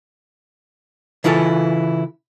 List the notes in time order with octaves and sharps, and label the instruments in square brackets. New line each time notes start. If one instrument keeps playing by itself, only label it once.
[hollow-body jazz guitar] C#3 E3 E4 F4 G4 A4